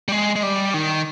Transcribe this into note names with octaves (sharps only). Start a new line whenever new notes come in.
G3
G#3
G#3
G3
D#3